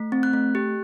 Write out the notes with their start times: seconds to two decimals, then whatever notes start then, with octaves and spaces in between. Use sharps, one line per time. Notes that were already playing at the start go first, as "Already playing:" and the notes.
Already playing: A3
0.12 C4
0.23 F#6
0.33 A3
0.55 G4